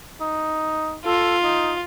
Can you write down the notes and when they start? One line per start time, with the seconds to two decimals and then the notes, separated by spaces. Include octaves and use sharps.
0.20 D#4
1.06 F4 A4
1.43 D#4